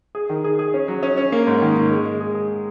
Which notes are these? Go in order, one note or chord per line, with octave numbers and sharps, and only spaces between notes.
G#4
D#3
G#4
G#4
C#4
F#3
C#4
C#4
A#3
G#2
D#3
A#3
G#3
G#3
G#4
G#4